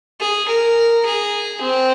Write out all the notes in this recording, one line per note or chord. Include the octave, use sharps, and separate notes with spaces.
G#4
A#4
G#4
C4